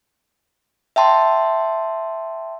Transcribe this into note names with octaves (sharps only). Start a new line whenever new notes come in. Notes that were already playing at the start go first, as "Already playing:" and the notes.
E5 G5 A5 C6